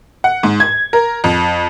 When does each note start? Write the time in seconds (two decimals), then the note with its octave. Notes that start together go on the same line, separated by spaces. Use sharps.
0.24 F#5
0.43 G#2
0.60 G#6
0.93 A#4
1.24 F2